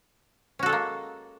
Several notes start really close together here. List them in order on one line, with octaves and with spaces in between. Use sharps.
C#4 F#4 A4 G#3 A#3